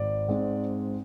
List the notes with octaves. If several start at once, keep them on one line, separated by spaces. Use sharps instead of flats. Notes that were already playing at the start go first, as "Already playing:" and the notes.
Already playing: G#1 D5
G#2 G#3 C4